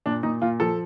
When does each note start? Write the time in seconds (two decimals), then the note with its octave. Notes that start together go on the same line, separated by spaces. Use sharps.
0.06 A#2 D4
0.23 A#2 D#4
0.42 A#2 F4
0.60 F3 A4